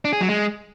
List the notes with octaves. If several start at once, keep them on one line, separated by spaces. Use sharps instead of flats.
D4
G#4
F#3
G#3